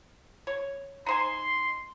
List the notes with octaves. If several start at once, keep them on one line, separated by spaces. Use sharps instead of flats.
C#5
D#4 C5 G#5 C6